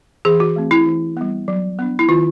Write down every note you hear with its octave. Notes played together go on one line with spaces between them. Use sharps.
E3 G#4
F#4
A3 C4
E4
E3
G3 B3
F#3
B3 D4
E4
D#3 F4